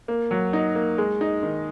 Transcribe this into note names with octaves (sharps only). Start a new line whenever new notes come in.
A#3
F#3
D#4
A#3
G#3
D#4
D#3